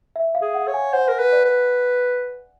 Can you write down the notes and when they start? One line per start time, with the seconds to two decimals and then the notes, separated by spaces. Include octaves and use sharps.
0.16 E5
0.35 F5
0.42 G#4
0.54 F#5
0.68 C#5
0.74 G#5
0.93 C5 F#5
1.08 A#4
1.19 B4
1.33 D5
1.45 B4